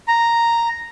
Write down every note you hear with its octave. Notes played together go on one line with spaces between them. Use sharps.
A#5